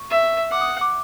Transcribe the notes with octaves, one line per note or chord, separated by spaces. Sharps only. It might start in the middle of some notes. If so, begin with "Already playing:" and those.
Already playing: C#6
E5
F#5 D6
D#6
D6